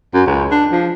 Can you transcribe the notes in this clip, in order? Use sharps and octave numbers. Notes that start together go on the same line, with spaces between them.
F#2
C#2
D4
F3